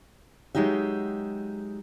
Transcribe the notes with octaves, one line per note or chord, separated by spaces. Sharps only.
F#3 G#3 D#4 G4 E5